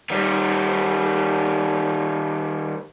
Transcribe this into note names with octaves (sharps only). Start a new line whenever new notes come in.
D#3 G3